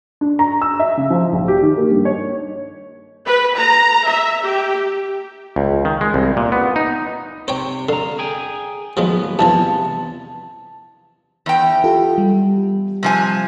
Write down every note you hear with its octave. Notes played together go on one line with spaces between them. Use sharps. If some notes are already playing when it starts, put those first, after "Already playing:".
D4
A#5
E6
E5
C#3
F3
A#1
G4
D#3
A#3
G2
C#5
B4
A#5
E5
G4
C#2
D#3
G#3
C2
A#2
B3
D#4
C3 C5 C#5 G5
D3 F5 A#5
G#4 G5 G#5
D#2 A2 F3 F#3 G#3 B3
E2 G2 C3 E3 F3 A5
E2 G5
F4 G4 A4
G3
C3 F3 G#5